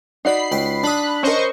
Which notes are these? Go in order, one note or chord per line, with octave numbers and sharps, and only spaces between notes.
D#4 F#4 D5 B5 C7
C#2 G5
D4 B5 D#6 F#6
C#4 A#4 C5 D#5 C#6